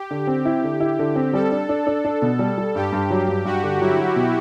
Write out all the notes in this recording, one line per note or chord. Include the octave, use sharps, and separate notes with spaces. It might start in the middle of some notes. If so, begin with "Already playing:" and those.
Already playing: G4
D3
C4
E4
D3
E4
D3
C4
G3 A4
D4
D4
D4
D4
B2
G3
G3
G2 G4
G2
F#3
G2
G2 F#4
D3
F#3 E4
F#3
B2